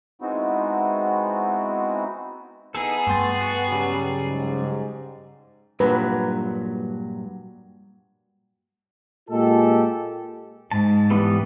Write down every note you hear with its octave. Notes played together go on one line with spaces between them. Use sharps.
G#3 B3 C4 D#4 E4 F#4
B3 D#4 E4 G#4 A4
G2 A3 G5 C6 A6
F#4
C#3 F#3 G3
G#2
G2 A#2 F#3 B4
A#2 G#3 F4 G4 A4
G#2 A5
E3 G3 B3